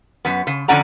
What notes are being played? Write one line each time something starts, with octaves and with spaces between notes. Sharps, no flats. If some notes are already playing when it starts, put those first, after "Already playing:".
F#2 B3
C#3
F2 D3 C#4 D5 F#5 A#5